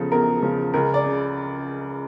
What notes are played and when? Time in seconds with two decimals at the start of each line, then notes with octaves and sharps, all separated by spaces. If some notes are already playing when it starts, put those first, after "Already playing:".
Already playing: E2 C#3 F3 A4
0.12 E2 A#4
0.43 C#3 F3
0.74 C#2 A#4
0.94 D5
1.04 C#3